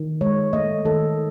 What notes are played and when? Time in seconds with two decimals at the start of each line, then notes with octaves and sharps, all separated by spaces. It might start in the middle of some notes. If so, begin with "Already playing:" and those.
Already playing: D#3
0.21 G#3 C#5
0.53 A3 D#5
0.85 D#3 A4